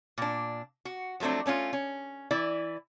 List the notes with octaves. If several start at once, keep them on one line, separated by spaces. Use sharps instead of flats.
A#2 D4
F#4
F3 F#3 A3 C4 D4
A3 C#4 D4 F4
C#4
E3 E4 D5